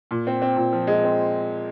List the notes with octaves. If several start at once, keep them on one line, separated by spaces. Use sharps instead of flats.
A#2
C4
C4
A#2
F3
G#3
C4